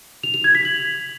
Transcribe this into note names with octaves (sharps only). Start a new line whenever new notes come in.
F7
F7
G#6
B6
F#7